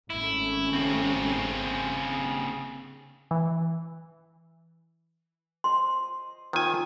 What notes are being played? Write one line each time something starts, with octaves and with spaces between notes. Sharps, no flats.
G#1 A3 C#4 E4
C#3 C4
E3
C5 D#5 C6
D#3 C4 F4 G#5 A5